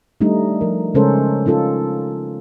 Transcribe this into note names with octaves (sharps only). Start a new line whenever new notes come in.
G3 A3 D4 D#4
F3 A#4
C#3 G#3 C#4 A4 A#4 C5
C#4 D#4 F4 A4